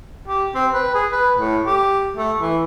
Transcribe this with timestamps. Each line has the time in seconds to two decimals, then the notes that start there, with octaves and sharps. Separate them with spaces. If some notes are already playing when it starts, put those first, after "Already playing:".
0.28 G4
0.55 C4
0.73 B4
0.94 G#4
1.12 B4
1.38 A2
1.66 G4
2.17 A3
2.40 E3